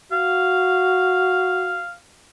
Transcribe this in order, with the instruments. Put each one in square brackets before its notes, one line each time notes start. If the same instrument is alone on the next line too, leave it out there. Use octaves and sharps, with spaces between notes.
[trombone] F#4 [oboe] F5